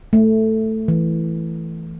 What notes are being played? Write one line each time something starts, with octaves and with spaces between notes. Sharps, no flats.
A3
E3